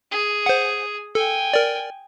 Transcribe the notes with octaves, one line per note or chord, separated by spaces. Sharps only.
G#4
C5 F#5
A4 G5 G#5
A#4 D5